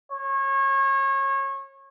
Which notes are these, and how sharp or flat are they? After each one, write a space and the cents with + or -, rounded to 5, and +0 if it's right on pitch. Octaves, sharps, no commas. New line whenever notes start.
C#5 -30